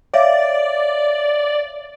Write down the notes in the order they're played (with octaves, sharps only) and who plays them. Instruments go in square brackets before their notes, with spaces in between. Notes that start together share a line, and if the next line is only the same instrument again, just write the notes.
[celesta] C#5 E5 F5 [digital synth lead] D5